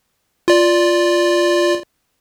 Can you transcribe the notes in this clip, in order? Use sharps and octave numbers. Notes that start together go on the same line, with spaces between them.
F4 D5